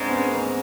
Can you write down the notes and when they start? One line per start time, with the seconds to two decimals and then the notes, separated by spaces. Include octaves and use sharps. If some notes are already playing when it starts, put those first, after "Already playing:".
Already playing: G#2 G#3 C4 D4
0.08 B3 C#4
0.28 A#3 C4